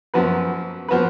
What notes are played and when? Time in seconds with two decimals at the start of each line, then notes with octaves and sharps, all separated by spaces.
0.14 F#2 F3 B3 F#4 B4
0.88 F3 B3 F#4 B4